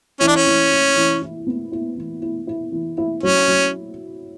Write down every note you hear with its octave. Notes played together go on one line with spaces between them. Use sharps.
E3 C#4
D4
C#4
E3
E4
E3
E4
B3
E4
E3
E4
E4
E3
E4
F#3 C#4
F#3